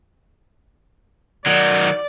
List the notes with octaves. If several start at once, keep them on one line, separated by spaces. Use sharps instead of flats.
D#3 F#3 D5